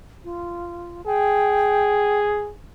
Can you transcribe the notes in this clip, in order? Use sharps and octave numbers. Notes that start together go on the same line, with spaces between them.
F4
G#4 G5